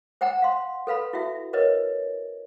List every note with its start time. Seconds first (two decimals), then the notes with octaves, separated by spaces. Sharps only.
0.21 C5 F#5 G5 A#5
0.42 F5 C6
0.87 A4 B4 F5 B5
1.13 E4 F#4 E5
1.53 A#4 B4 C#5 D#5